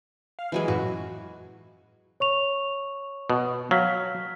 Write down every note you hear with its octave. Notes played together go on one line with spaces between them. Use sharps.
F5
E3 F#3 G#3 E4
F#2 A2 F#4
C#5 C#6 F7
B2
F#3 F5 F6 B6